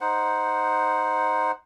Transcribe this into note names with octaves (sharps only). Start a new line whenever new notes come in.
D#4 C5 F#5